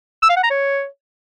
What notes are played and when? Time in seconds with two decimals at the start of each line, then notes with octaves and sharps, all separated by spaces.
0.23 E6
0.30 F5
0.37 F#5
0.44 A#5
0.51 C#5